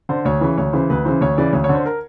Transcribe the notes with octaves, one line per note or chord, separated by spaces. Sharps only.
D3 C5
D2 C#5
C#3 E3
D2 C#5
C#3 E3 C5
D2 B4
C#3 E3 C5
D2 C#5
C#3 E3 D5
D2 C#5
C#5
D3
C5
A#4